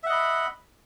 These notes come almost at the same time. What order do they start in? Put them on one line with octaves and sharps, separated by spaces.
E5 F#5 D#5 B5